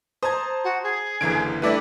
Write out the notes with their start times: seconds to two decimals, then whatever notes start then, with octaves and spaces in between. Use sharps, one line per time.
0.23 C5 A5 A#5 D#6 G#6
0.64 F#4
0.83 G#4
1.21 F#1 D3 E3 A#5 G#6 D7
1.62 G3 A3 D4 E4 B4 D5